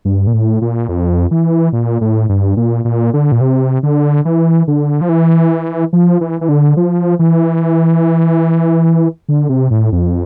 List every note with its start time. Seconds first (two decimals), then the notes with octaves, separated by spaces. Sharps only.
0.05 G2
0.27 A#2
0.34 A2
0.62 A#2
0.89 F2
1.31 E3
1.73 A#2
2.01 A2
2.29 G2
2.57 A#2
2.85 A#2
3.14 D3
3.32 A#2
3.41 C3
3.83 D3
4.25 E3
4.68 D3
5.01 F3
5.09 E3
5.93 F3
6.21 E3
6.41 E3
6.49 D3
6.77 F3
7.19 E3
9.29 D3
9.49 C3
9.71 A2
9.92 F2